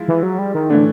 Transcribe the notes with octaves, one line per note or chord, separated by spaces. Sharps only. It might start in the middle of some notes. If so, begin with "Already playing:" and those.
Already playing: F3 G#3 E4
E3
F#3
G3
D#3
A2 D3 E3 A3 D4